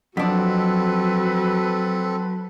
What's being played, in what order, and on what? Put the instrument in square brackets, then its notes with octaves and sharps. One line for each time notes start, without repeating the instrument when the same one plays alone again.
[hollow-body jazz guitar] F2 D4 [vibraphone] F#3 [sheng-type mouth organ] C4 A4 [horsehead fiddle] F#4 B4